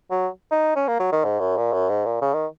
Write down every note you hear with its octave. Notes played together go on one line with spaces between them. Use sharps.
F#3
D#4
C#4
A#3
F#3
D#3
G#2
F#2
A#2
F#2
G#2
A#2
C#3
D#3